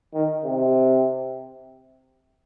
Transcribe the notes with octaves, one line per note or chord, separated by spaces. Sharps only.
D#3
C3